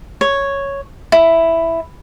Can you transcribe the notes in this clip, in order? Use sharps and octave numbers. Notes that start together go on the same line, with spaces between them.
C#5
E4